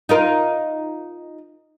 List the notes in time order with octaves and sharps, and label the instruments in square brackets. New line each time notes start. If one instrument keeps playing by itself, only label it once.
[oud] D#4 F4 A#4